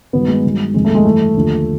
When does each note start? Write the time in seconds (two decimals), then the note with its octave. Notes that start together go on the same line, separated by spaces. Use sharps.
0.13 G2 D#3 F#3 B3
0.28 G#3
0.44 G2 D#3 F#3
0.74 F2 C3 D#3 G#3
0.85 A3
0.95 G#3
1.04 G2 E3 A3
1.35 D#2 D3 F3